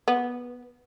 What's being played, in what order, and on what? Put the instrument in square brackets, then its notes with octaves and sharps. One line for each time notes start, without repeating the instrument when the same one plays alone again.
[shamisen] B3